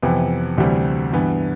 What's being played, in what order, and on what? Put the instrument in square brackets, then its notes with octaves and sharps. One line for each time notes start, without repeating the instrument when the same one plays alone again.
[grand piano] F2 C3 E3 B3
D2 C3 E3 G3
G2 E3 B3